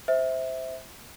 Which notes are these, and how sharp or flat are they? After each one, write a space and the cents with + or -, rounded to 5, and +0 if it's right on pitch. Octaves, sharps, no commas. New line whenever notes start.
C5 +0 E5 -15